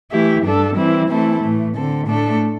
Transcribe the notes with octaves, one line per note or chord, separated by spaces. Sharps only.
E3 A3 E4 G4
G2 G3 D4 A4
E3 G3 C4 E4
E3 A3 C4 E4 A4
A2 E3 A3
D3 C4 A4
A2 A3 D4 A4